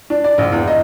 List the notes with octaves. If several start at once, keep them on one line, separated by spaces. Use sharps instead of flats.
D4
D5
A#1
E2
D#5